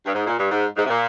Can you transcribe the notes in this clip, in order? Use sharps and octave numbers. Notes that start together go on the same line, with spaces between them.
G2
G#2
A#2
G2
G#2
G#2
C3
A#2